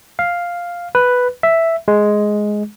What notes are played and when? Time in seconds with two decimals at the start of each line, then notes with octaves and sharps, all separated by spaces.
0.19 F5
0.95 B4
1.43 E5
1.88 G#3